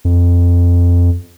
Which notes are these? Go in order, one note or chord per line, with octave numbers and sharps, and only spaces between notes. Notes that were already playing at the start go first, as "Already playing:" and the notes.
F2